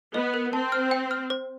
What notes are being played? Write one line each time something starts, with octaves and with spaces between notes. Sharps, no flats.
B3 D#5
A#4
C4 A5
F6
G5
F6
C5